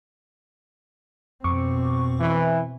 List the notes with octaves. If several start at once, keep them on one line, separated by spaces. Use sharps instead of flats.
F2 B2 C4 C#6 D6
E3